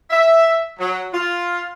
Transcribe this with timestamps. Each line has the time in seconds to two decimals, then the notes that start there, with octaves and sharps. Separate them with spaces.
0.11 E5
0.79 F#3
1.12 F4